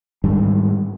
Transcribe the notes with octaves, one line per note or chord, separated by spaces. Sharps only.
G#2 D#3 G3 D4